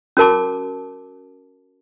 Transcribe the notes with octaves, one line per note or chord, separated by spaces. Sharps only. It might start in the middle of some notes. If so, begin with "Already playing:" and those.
C#4 F#4 A#4 A5 D6